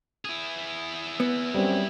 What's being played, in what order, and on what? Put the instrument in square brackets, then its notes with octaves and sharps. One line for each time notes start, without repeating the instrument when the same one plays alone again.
[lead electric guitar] E4 G#4
[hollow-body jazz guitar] B3
[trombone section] F#2 C4 C#4 [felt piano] G3